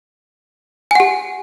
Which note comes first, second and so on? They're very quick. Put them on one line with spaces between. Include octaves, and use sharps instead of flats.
G#5 F#5 G4